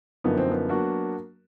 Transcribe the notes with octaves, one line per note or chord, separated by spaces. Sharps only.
F#2 D3 F3 A#3 B3 D#4
C4
B3
F#3 A#3 D4 F#4